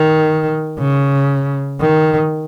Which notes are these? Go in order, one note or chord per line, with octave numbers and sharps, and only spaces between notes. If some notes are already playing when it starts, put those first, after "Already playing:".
Already playing: D#3
C#3
D#3